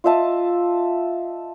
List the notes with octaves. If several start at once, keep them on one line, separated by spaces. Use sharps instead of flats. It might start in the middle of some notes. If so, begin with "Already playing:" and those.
F4 D#5 E5 A5